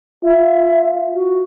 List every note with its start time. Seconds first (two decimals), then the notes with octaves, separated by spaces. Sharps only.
0.24 F4 E5
1.14 F#4